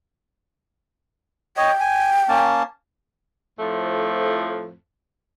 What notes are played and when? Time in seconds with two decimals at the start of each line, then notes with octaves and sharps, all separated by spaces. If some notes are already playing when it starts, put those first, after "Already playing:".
1.57 C#5 D#5 G5
1.80 G#5
2.28 A#3 C#4 A5
3.59 F2 A2 F3 A3